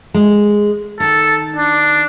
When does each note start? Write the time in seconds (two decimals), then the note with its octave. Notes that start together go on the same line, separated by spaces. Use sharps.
0.14 G#3
1.00 D#3 A4
1.56 D4